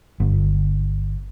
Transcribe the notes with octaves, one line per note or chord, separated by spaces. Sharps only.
G1